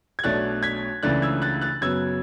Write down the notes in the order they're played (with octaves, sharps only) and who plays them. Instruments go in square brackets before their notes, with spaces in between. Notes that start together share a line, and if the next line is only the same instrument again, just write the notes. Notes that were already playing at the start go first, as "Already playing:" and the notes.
[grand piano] G#6
B1 B2 A3 D4 F#6 A6
G#6 B6
C#2 C#3 E3 A3 D4 F#6 A6
E6 G#6
F#6 A6
F#6 A6
F#2 C#3 F#3 B3 E6 G#6